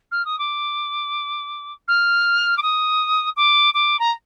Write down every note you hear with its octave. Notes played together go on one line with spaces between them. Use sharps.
F6
D#6
D6
F6
D6
D#6
D6
D6
A#5